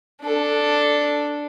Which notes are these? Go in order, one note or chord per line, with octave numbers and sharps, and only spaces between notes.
D4 A4